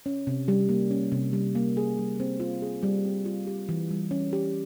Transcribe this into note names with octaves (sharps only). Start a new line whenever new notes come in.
C#4
C3
G3
A#3
C#4
C3
G3
A#3
G#4
G3
C4
F4
G#4
G3
C4
F4
G4
E3
G3
C#4
G4